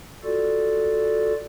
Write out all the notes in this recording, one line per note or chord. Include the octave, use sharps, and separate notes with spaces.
F4 F#4 A4 D5